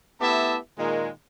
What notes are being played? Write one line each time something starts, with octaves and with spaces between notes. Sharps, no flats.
A3 B3 E4 G4 E5 A5
A#2 D#3 G#3